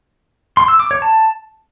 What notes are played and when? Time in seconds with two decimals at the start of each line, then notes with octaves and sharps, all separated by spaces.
0.57 C6
0.68 E6
0.80 D6
0.91 C#5
1.02 A5